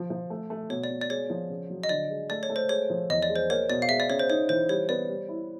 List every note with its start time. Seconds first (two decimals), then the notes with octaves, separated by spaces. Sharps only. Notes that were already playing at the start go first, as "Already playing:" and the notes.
Already playing: F3
0.10 F3
0.30 A3
0.50 A3
0.70 B2 C#5
0.84 D5
0.90 B2
1.01 D5
1.10 G#3 C#5
1.30 F3
1.50 C#3
1.70 F#3
1.84 D#5
1.89 D3 D5
2.10 G#3
2.30 A3 D5
2.43 C#5
2.50 A3
2.56 C5
2.69 G#3 C#5
2.90 F3
3.10 E2 D#5
3.23 D5
3.30 G#3
3.36 C5
3.50 A#3 C#5
3.70 B2 D5
3.82 F5
3.89 G#3 E5
4.00 D5
4.10 C#3 C#5
4.19 C5
4.29 D#4 C#5
4.49 E3 C5
4.69 G3 C#5
4.89 B3 D5
5.09 G3
5.29 E4